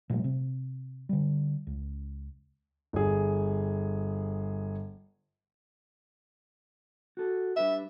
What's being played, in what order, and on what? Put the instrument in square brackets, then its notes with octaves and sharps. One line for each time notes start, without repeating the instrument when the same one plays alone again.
[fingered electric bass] A#2 F3 G3 A3
C3
D3 G3
C#2
[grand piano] G1 G#4
[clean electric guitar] F#4 A4
[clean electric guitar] G3 D4 B4 [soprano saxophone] E5